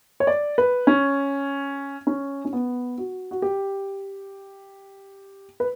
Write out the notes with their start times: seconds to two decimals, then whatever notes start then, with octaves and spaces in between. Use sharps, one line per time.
0.20 C#5
0.27 D5
0.58 B4
0.87 C#4
2.07 C#4
2.45 C#4
2.53 B3
2.98 F#4
3.31 F#4
3.42 G4
5.60 B4